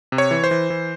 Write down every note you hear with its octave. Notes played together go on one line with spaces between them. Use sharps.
C3
C#5
E3
C5
E3
E3